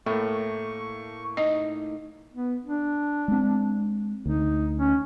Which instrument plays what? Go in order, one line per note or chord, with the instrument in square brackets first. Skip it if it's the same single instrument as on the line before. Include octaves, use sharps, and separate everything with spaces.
[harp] A2 [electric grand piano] A3 A#3 [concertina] C#6
[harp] D#4 [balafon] D#5
[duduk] B3
D4
[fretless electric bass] G#3 C4
[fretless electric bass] D2 [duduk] D#4
[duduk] C#4